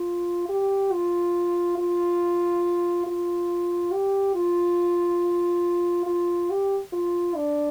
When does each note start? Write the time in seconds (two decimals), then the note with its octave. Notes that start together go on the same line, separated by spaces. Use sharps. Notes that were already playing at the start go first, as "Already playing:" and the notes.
Already playing: F4
0.49 G4
0.93 F4
1.78 F4
3.06 F4
3.93 G4
4.35 F4
6.07 F4
6.51 G4
6.93 F4
7.36 D4